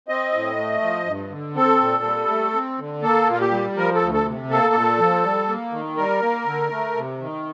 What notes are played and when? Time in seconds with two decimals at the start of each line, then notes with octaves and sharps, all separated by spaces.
0.08 C4 D#5
0.33 A2
0.57 A3
0.81 F3
1.06 G2
1.30 D3
1.56 C4 A4
1.80 A#2
2.04 G3
2.28 A3
2.54 C4
2.79 D3
3.02 A#3 A4
3.28 A#2 F4
3.40 G4
3.51 G3
3.77 F3 A#4
3.95 A4
4.01 D2
4.14 A4
4.26 C3
4.50 A#3 A4
4.74 A#2
4.99 F3
5.24 G3
5.48 A#3
5.72 D#3
5.97 G3 A#4
6.22 A#3
6.46 D3
6.71 A3
6.96 C3
7.20 D#3